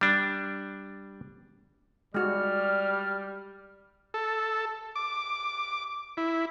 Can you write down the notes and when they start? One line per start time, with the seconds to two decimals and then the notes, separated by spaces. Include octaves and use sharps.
0.01 G3 D4
2.14 G3 G#3 F#4 D5 F6
4.14 A4
4.96 D6
6.17 E4